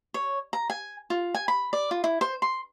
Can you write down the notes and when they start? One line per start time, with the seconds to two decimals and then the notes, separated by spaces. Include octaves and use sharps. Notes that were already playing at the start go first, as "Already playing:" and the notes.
0.14 C#5
0.53 A#5
0.70 G#5
1.10 F4
1.35 G#5
1.48 B5
1.73 D5
1.91 F4
2.04 E4
2.21 C5
2.42 C6